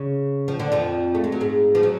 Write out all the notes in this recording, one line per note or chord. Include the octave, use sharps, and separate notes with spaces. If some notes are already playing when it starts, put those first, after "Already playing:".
Already playing: C#3
F3
D3
F2 F3
A3
G#3
F#3
G#2 G#3
F3
F#3